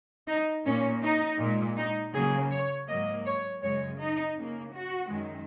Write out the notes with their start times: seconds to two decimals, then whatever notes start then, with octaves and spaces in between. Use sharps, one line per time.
0.28 D#4
0.65 A#2 A#3 C#4
1.03 D#4
1.39 A#2 G#3
1.77 D#4
2.14 C#3 F#3 A#3 G#4
2.51 C#5
2.88 G#2 F#3 A#3 D#5
3.26 C#5
3.63 F#2 C#3 G#3 C#5
4.00 D#4
4.37 C#3 A#3
4.75 F#4
5.11 F#2 D#3 G#3